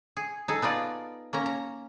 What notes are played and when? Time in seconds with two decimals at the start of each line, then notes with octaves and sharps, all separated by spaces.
0.17 G#4
0.48 D#4 G#4 A4
0.62 B3 D#4 F4 D5
1.33 A#3 C#4 A#5
1.46 A#5